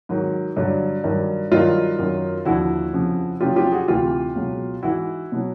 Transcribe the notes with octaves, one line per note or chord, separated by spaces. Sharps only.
G#2 D#3 F#3
G2 D3 F#3
G2 D#3 F#3
G2 D#3 F#3 D#4 F4
F#2 D#3 F#3
D#2 D3 F3 E4 F#4
F2 C#3 F3
F2 C#3 F#3 F4 G4
F4 G4
F#4 G#4
D2 C3 E3 F4 G4
C#2 B2 F#3
G#2 E3 E4 F#4
B2 F#3